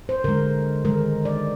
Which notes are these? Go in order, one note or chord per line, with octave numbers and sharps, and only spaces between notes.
C5
D3 G#3 A#4
D#3 G#3 A#4
D5